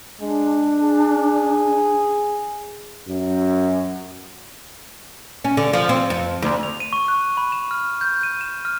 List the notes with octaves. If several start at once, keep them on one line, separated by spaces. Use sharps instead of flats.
G#3 D4
G#4
F#2
C#4
D3
F3
C4
F2
D2
F7
D#7
C#6
F#6
B5
E7
F6
G6
D#7
E7
F6